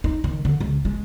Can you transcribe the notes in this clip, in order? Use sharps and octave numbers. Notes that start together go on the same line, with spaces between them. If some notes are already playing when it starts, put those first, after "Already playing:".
D#4
D#3
D3
C#2
G#3